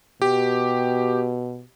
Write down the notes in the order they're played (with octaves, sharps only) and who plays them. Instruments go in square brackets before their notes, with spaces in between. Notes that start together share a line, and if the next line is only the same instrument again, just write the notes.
[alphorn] B2 [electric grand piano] G4